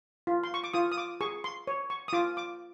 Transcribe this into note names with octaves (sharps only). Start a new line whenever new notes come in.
F4
C6
C#6
D6
F4 D#6
D#6
D6
G#4 C#6
C6
C#5
C#6
D#6
F4 D6
D6